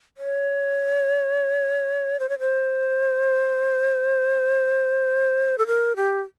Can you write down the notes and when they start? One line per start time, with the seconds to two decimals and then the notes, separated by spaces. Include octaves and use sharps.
0.17 C#5
2.20 C5
2.29 C#5
2.39 C5
5.58 A4
5.67 A#4
5.96 G4